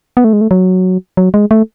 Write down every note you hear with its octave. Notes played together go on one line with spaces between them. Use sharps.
B3
A3
G#3
A3
F#3
F#3
G#3
A3